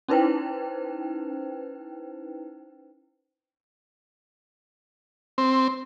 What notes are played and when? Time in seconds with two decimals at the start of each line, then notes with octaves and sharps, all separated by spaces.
0.08 C#4 D#4 E4 B4 C5 G5
5.38 C4